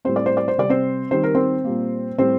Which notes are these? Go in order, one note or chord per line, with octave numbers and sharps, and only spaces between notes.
A2 G3 C4 C5
D5
C5
D5
C5
C3 G3 C4 D5
C4 C5
D#3 G3 C4 C5
A#4
C4 C5
A#2 G3 A#3
A2 G3 C4 C5